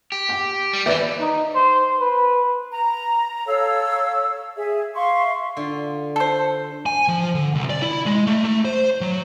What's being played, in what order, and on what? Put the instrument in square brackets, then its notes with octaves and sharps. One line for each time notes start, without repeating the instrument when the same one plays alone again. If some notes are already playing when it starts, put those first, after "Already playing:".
[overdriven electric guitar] G4
[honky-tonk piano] G5
[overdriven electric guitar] G3
[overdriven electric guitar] D#2 E3 [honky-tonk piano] B4 D5 E5
[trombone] D#4
C5
B4
[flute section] A#5
A4 C#5 F5 E6
G#4 E5
E5 F5 C6 C#6
[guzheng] D3 F4
[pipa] A4 C5
[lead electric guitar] G#5
F3
D3
C2
D5
E4
G#3
A3
A3
C5
F#3